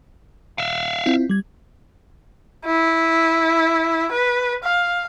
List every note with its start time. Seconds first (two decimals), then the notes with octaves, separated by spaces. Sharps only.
0.58 E5 F5
1.06 C4 E4 F4
1.29 G3 G#6
2.66 E4
4.12 B4
4.64 F5